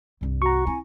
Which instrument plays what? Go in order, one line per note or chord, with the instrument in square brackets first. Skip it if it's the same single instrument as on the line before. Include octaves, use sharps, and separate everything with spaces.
[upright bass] C2 G2
[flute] F#4 [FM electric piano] A#5 C#6
[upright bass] C4 E4 [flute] G#5